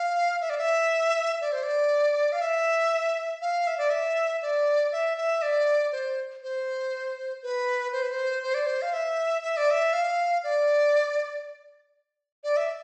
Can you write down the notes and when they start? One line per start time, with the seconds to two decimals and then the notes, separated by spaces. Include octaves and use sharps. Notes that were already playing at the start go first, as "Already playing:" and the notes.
Already playing: F5
0.41 E5
0.50 D5
0.58 E5
1.41 D5
1.52 C5
1.63 D5
2.32 F5
2.41 E5
3.42 F5
3.67 E5
3.78 D5
3.90 E5
4.42 D5
4.92 E5
5.17 E5
5.42 D5
5.92 C5
6.43 C5
7.43 B4
7.93 C5
8.03 B4
8.12 C5
8.43 C5
8.54 D5
8.66 C5
8.82 F5
8.93 E5
9.43 E5
9.57 D5
9.71 E5
9.93 F5
10.44 D5
12.44 D5
12.57 E5